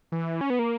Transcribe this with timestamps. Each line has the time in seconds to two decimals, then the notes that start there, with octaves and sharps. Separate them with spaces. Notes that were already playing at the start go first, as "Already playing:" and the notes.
0.12 E3
0.41 C#4
0.50 B3
0.59 A#3